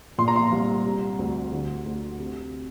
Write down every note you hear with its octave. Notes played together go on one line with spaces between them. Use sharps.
A#2 C6
A#5
C6
C2
C3
D2
D3
D2
C3